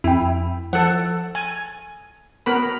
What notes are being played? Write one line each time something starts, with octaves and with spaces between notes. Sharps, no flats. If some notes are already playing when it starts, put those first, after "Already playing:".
F2 E4 G5
F3 A4 F#5
G#5
B3 A#4 B5